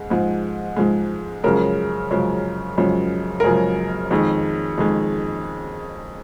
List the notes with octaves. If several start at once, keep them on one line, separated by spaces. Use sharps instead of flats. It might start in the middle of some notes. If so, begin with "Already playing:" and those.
Already playing: G#2 G#3
G#2 F3 G#3
G#2 F3 G#3
F#2 C#3 F3 G#3 A#4
F#2 C#3 F3 G#3
F#2 C#3 F3 G#3
A#4
F#2 C#3 F3 G#3 G#4
F2 D#3 G#3
F2 D#3 G#3